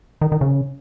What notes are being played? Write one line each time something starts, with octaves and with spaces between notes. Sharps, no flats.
D#3
D#3
C#3